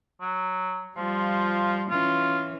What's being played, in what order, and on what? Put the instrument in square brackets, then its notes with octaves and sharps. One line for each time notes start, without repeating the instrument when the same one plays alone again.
[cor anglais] F#3
[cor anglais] F3 [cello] G3 F4
[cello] E3 C#4 [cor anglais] F4